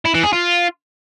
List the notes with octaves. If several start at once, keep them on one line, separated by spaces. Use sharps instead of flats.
E4
E3
G#4
F4